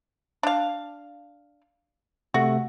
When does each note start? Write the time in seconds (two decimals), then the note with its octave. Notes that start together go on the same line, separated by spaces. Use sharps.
0.43 D4 F5
2.34 C3 A3 F#4